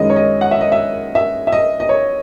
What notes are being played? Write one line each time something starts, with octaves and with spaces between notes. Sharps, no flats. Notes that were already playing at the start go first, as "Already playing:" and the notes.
Already playing: F#2 D#3 G#3 C#4 E4 D#5
C#5
D#5
F#5
E5
D#5
E5
E5
E5
D#5
D#5
C#5